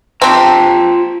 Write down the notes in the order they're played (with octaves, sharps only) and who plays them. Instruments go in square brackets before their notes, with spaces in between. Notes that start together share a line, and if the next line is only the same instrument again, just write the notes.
[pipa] C4 G4 [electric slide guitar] F4 A5 A#5